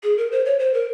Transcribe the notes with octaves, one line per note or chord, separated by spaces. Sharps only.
G#4
A#4
C5
C#5
C5
A#4